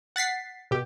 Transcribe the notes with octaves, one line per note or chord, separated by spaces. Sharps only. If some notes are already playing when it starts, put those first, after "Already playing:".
F#5 A6 B6 C7
B2 G4